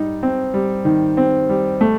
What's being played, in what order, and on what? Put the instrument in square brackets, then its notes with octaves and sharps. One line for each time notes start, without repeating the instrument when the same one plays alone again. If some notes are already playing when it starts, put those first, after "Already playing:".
Already playing: [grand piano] G3 D#4
C4
G3
D#3
C4
G3
A3